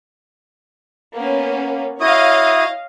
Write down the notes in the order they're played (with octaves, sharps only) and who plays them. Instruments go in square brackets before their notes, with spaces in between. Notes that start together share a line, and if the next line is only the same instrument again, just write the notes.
[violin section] A#3 B3 C#4
[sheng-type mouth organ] E4 F#4 D#6 [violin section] C#5 D#5 F5